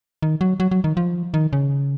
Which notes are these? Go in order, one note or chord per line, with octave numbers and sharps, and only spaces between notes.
D#3
F#3
F#3
F#3
D#3
F3
D#3
C#3